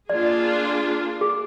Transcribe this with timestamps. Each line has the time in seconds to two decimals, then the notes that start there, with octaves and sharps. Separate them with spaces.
0.10 A#3 D4 F4 G#4 D5
1.21 G#4